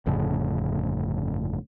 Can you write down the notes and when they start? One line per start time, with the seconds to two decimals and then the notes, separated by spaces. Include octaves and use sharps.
0.06 G1 F2 A2 C#3